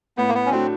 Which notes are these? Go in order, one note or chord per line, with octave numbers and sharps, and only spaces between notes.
A2 B3
A#3
B3
C#4
F#3 A3 C4 D4 F#4